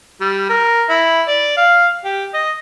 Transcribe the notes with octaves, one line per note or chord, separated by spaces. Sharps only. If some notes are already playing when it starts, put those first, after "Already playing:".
G3
A#4
E4
D5
F5
G4
D#5